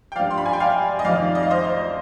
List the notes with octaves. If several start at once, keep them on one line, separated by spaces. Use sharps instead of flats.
G5
G2 F3 D5 F5
C6
B5
G#5
G5
D5 F5
D#5
F2 D#3 D5 F5
D#5
F5
C5 D#5
C5